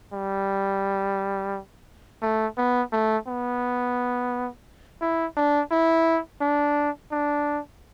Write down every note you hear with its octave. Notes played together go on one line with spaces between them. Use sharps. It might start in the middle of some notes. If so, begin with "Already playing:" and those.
G3
A3
B3
A3
B3
E4
D4
E4
D4
D4